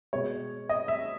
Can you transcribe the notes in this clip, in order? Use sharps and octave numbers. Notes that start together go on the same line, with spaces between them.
B2 G#3 C#5
D#5
E5